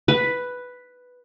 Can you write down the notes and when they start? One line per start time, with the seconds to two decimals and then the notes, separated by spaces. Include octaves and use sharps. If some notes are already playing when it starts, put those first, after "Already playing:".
0.08 B4